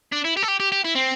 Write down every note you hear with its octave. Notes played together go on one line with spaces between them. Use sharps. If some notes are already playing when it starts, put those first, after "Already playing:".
D4
E4
G4
A4
G4
G4
G4
E4
C4